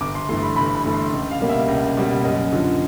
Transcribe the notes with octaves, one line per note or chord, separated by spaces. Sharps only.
G1 D6
C6
G2 E3 A3 C6
B5
G1 B5
B5
G2 E3 A3
C6
C#2
F5
B2 G3 A#3
E5
C#2
B2 G3 A#3
F#2 D#5
D3 F3